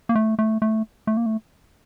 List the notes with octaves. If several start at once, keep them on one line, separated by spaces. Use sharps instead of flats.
A#3
A3
A3
A3
A3
A#3
A3